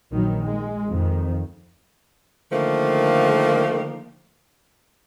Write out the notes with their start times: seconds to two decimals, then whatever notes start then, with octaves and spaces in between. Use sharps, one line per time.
0.11 A#1 D#3 F#3
0.44 G#3
0.89 F2 D#3
2.51 D3 D#3 F3 A3 A#3